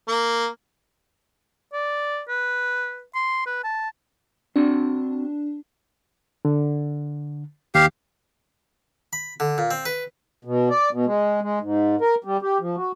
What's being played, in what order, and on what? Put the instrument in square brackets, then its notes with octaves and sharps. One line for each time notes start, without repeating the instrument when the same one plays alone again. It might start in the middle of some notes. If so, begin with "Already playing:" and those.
[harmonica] A#3
[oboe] D5
B4
C6
B4
A5
[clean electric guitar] C4 F#4 C6 [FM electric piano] D4
[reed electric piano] D3
[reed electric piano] D#2 [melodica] G4 F5
[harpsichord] B5
D3
A#2
C4
B4
[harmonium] B2
D5
B2
G#3
G#3
G#2
A#4
G3
G4
F3
F#4